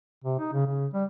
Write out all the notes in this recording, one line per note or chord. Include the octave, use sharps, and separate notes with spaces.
C3
D#4
C#3
C#3
G3